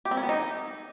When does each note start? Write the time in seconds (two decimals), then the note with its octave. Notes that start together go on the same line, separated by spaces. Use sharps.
0.05 G4
0.11 C4
0.17 C#4
0.23 B3
0.29 D#4